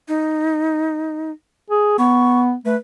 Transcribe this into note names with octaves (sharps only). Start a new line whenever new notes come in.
D#4
G#4
B3 C#6
A3 B4